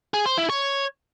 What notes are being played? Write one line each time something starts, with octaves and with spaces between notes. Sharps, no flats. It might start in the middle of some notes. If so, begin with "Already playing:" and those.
G#4
C5
E4
C#5